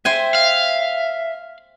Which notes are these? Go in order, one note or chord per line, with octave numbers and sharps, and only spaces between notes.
C5 E5 G5 G#5
F5